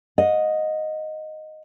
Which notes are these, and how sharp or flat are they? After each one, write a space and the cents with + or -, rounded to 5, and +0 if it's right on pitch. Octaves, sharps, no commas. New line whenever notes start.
D#5 +0 F#5 -35